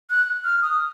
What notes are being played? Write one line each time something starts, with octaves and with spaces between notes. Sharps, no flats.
F#6
F6
D#6